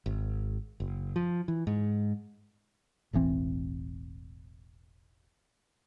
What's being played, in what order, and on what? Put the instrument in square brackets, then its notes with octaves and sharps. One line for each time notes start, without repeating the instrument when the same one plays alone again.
[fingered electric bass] G#1
F#1
F3
E3
G#2
E1 A1 E3 C4